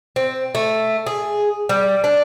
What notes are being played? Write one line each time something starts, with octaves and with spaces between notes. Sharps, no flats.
C4
A3
G#4
G3
D4